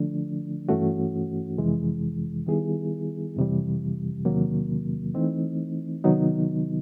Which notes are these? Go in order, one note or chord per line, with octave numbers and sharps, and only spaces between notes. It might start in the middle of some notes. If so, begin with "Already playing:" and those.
Already playing: D3 F3 A3 D4
G2 E3 A3 C#4 F#4
F2 C3 E3 G#3
D#3 G3 B3 E4 G#4
F2 C3 E3 G3
E2 C3 D#3 F#3 A#3
E3 A3 C4 D#4
C3 D#3 F#3 B3 D#4